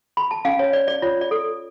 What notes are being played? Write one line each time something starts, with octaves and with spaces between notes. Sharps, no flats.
B5
A5
C#4 F5 G#5
C#5
C#5 D5
D5
F4 C#5
D5
A4